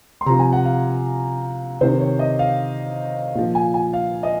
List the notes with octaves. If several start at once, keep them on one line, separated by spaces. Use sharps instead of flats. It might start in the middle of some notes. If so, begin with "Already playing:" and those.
C6
C3 F3 A#5
G#5
F#5
F5
C3 D#3 C5
C#5
D#5
F5
A#2 F3
G#5
G#5
F5
D#5